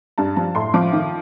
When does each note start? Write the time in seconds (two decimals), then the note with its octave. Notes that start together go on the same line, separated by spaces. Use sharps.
0.18 G2 A5
0.36 F3 A5
0.55 A2 C6
0.74 F3 D6
0.93 D#3